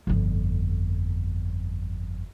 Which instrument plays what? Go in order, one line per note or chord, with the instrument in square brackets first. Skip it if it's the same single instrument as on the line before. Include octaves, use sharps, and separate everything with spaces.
[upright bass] G1 F2